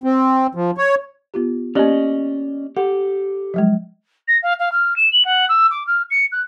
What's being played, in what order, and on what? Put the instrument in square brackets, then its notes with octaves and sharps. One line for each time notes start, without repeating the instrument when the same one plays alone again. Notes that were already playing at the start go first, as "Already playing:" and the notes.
[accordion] C4
F3
C#5
[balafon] B3 F4 G4
[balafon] A#3 G4 [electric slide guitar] C#4 D5 D#5
[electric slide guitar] G4 A4 [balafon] F#5
[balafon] F3 F#3 G#3
[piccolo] A#6
F5
F5
F6
E7
F#7
F#5
E6
D6
F6
C#7
F#6